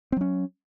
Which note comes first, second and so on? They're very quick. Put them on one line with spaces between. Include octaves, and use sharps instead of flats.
C4 F#3 C#4